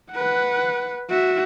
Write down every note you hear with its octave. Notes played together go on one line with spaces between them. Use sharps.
B4 F#5
F#4 E5